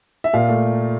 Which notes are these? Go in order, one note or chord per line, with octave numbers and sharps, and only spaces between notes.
E5
A#2 F5
A3